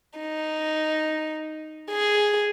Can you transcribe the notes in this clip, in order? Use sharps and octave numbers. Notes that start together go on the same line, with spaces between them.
D#4
G#4